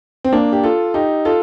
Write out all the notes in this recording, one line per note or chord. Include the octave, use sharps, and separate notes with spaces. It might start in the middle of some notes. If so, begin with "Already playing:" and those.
C4
A#3 D4
G4
F4 A4
D#4 G4
F4 A4